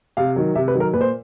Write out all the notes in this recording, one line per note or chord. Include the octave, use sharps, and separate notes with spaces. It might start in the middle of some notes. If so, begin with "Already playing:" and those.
C3 F5
D#3 F#3
C3 E5
B4
D#3 F#3
A#4
A#2 B4
C5